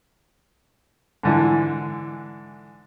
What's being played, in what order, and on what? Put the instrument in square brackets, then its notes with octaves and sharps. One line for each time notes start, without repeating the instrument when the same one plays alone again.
[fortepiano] G#2 D3 E3